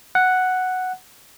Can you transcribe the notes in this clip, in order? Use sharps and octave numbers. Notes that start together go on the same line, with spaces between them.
F#5